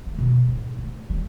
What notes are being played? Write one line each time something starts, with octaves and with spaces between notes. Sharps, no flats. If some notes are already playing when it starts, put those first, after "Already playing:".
G#3
B2
G#2
A3
G3